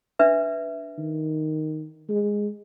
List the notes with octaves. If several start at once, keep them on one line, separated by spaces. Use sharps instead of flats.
D4 B4 E5
D#3
G#3